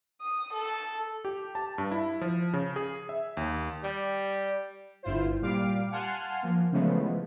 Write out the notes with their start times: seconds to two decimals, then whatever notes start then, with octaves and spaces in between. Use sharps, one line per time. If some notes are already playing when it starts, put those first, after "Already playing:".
0.21 D#6
0.53 A4
1.25 G4
1.55 A5
1.78 G2
1.91 E4
2.21 F3
2.53 C#3
2.76 G#4
3.09 E5
3.37 D#2
3.83 G3
5.03 G1 G2 E4 F4 C5
5.42 A#2 G3 F5 D6 D7
5.91 F5 F#5 G#5 A5 C6 F6
6.43 F3 A#3
6.72 C#3 E3 F3 G#3 A3 B3